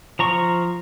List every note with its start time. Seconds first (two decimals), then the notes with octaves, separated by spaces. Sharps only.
0.19 F3 A#5 C#6